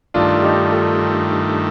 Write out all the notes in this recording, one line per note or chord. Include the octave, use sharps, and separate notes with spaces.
G2 D#3 A3 D4 F4
D#4 G4
F4 A4